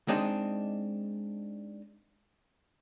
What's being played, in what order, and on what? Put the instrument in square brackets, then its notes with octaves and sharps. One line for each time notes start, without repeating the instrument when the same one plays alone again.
[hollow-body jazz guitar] G#3 C4 D4 D#4 D#5